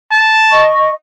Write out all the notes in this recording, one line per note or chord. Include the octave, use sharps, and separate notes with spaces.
A5
D#5 C#6